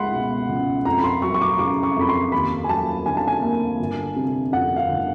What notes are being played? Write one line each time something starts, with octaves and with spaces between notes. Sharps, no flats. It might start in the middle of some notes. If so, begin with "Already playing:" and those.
Already playing: C#2 G#3 F#5 B5 C6
B2
C#2
F2 A#5
B5
C6
F#3 C#6
C#6
D6
C#3 D6
C#6
F2 B5
C6
D#2 B5
G#5
F#3 A5
D3 G#5
A5
G#5
A#3
G1
C3
F2 F#5
F5
G1